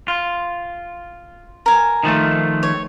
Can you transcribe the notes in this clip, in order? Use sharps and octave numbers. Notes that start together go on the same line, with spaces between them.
F4
A#4 G#5
D#3 F3 A3
C#5